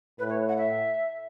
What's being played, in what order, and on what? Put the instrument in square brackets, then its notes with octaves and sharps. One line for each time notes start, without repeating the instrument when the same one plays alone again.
[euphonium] A2 [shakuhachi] B4
[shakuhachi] C#5
F#5
E5